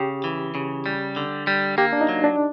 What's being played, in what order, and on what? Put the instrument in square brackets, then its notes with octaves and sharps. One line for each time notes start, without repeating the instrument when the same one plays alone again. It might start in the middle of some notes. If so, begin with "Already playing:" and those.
Already playing: [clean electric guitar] C#3 [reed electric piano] G4
[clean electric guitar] E3
C#3
G3
D3
G3
[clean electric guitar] A#3 [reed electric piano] G4
[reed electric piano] D4
D#4
[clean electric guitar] F#3
[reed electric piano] D4